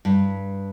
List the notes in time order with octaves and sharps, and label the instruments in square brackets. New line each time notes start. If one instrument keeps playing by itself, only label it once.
[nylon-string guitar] G2